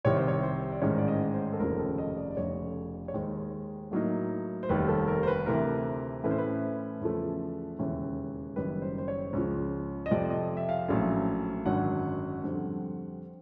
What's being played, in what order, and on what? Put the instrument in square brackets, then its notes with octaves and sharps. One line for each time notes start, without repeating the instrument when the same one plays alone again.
[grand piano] C2 C3 D#3 C#5
C5
C#5
C5
D5
A1 G#2 D#3 G#3 C#4 C#5
D5
D#5
C5
A4
F1 D#2 C#3 F3 A#4
A4
D#5
D5
D5
F1 F2 C#3 C#5
C#5
D#2 D#3 G#3 C5
A2 F#3 A#3 D#4
C5
F1 D#2 D#3 G3 B4
A4
A#4
C5
B4
D2 C3 E3 A3 C4 A#4
A2 E3 A3 C#4 B4
C5
B4
E2 C#3 F3 A3
E1 D#2 C#3 E3
F#1 F#2 D#3 G3 B4
C5
C5
C#5
C#2 C#3 F3
D#5
F2 C3 F3 D5
D#5
E5
F5
A#1 A2 F#3 A3 C#4
G#1 F#2 D3 F#3 F#5
F2 D3 G3 C4